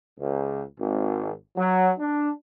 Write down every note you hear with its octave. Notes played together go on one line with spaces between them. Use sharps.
C#2
G#1
F#3
D4